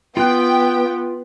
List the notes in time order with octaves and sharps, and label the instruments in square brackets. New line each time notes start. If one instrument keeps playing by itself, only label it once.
[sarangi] B3 [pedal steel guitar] F4 F#6 [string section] G5